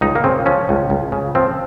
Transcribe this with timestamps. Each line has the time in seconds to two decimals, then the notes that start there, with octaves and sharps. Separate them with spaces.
0.01 C#2 D#4
0.15 A#3
0.24 C#3 C4
0.46 F3 C#4
0.69 C#2
0.90 C#2
1.12 C#3
1.35 F3 C4